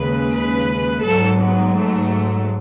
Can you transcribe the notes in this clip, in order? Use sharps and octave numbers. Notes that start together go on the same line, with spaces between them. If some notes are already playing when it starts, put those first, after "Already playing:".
Already playing: D#2 C#3 G#3 B4
B4
G#2 F#3 A4
B3
A3